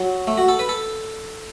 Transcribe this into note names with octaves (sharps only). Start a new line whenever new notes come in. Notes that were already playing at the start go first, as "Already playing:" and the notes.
Already playing: F#3
A3
F#4
A4
B4
A4